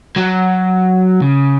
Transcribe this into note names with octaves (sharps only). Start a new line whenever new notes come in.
F#3
C#3